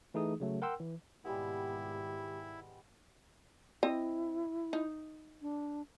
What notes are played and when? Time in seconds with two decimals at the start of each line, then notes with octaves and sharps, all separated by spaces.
0.14 E3 A3 D#4 G#4 D#6
0.40 C#3 F#3 A3
0.62 A#4 F#5 G5 C6 E6
0.80 E3
1.25 G#1 B2 G3 G#3 B3 E4 G4
3.83 C4 E4 D#5
4.73 D#4
5.42 D4